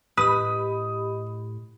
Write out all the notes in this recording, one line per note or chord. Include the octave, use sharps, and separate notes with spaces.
A2 G4 B4 D#5 B5 D#6